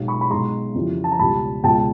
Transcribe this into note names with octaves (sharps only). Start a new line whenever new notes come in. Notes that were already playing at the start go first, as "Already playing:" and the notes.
Already playing: B1 B2 G#3
B5 C#6
B5
B1 B2 G#3 A#5 C6
F2 C#3 E3 G3
A5
A#5
C#2 B2 G3 A5 B5
C#2 B2 G#3 G5 A5